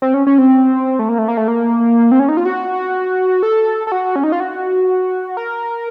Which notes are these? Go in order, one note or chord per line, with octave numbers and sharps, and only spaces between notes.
C4
C#4
C#4
C4
A3
A#3
A3
A#3
A3
A#3
C4
C#4
D#4
F4
F#4
A4
A4
F#4
C#4
D#4
F4
F#4
A#4